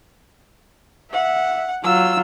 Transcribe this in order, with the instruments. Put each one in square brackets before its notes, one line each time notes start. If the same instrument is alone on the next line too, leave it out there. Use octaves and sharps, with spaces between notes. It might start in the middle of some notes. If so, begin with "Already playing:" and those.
[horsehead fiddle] E5 [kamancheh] F#5
[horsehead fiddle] F#3 F4 [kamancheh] E6